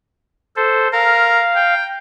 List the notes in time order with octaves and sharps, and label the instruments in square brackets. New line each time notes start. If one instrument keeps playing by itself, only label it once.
[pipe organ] A4 C5
[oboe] A#4 [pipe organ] F5
[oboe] G5